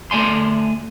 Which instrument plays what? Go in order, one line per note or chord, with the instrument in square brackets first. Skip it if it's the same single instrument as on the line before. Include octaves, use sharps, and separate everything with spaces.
[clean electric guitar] A3 D5 G#5 C6